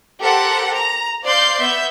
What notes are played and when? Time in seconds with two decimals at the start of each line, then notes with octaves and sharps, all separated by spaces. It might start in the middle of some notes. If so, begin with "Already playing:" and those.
0.21 G4 A4 A#4 C5 F#5
0.74 A#5
1.24 C5 D5 F5 C6 G6 C7
1.59 B3 E5 G6